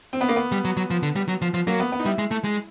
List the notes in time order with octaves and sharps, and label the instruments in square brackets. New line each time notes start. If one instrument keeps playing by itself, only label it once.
[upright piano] C4
B3
A#3
B3
[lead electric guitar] G3
F#3
F#3
F3
D3
G3
F#3
F3
F3
[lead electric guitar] F#3 [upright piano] A#3
[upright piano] B3
B3
D#4
[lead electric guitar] G3 [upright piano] E4
[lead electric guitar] G#3
A3
G#3